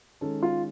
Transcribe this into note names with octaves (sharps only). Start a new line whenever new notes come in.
D#3 G#3 C#4 A4
F4